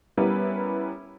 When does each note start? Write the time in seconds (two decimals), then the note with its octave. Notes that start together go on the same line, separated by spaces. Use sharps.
0.17 G3 B3 C#4 E4 A#4 B4